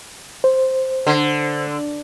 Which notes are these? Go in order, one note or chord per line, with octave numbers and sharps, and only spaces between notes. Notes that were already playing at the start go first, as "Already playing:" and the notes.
C5
D3